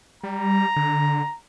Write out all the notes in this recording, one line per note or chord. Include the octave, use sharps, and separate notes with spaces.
G3 A#5
D3